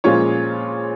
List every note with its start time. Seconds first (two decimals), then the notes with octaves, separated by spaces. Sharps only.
0.04 A#2 F3 G#3 C#4 F4 C#5